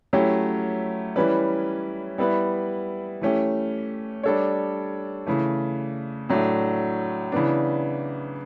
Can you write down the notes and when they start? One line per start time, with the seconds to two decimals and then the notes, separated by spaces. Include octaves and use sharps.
0.13 F#3 A3 C#4 E4 G4
1.16 E3 G3 C#4 E4 B4
2.18 G3 B3 E4 B4
3.21 E3 A3 C#4 G4
4.23 G3 D4 A4 C#5
5.26 C#3 E3 A3
6.29 A2 F#3 A3 D4
7.32 C#3 E3 B3 D4